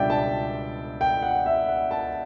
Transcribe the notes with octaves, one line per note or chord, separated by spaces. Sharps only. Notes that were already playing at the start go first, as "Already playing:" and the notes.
Already playing: C#2 B2 G3 D4 D5 E5 G5
A5
G5
F#5
E5
F#5
A5